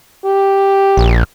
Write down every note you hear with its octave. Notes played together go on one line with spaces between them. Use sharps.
G4
A#1